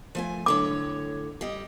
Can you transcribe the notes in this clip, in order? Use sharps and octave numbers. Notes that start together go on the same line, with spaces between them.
F3 A3 G#5
A2 D3 C#5 D6
G3 D#5